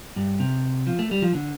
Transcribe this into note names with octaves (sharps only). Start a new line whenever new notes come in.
G2
C3
F3
A3
G3
F3
D3